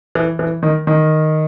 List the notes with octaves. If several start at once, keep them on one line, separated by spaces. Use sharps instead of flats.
E3
E3
D#3
D#3